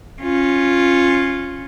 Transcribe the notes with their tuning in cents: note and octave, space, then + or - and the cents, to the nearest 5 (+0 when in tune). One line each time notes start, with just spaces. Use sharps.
C#4 -15 F4 +0